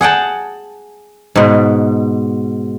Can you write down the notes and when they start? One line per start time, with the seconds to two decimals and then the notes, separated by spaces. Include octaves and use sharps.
0.01 G#4 F#5 G5 A5
1.35 G#2 B2